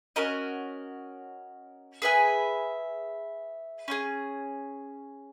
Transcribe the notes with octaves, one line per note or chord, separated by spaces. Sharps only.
C#4 F#4 A#4 D#5
G#4 B4 E5 G#5
C#4 E4 G#4